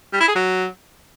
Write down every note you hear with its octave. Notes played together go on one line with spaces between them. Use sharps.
G3
E4
G#4
F#3